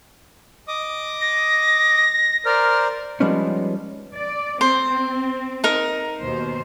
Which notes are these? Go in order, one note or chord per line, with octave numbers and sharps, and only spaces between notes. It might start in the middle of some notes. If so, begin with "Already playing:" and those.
D#5 D6 D#6
A#6
A#4 C5 D5 F6
F3 G3 G#3 B3 C#4 D#4
D5
C4 C5
D#4 A#4
D#2 B2 C5